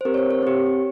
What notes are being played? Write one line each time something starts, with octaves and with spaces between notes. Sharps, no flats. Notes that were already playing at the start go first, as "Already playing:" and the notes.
C5
C4 G4 A#4
C#5
C5
C#5
C4 G4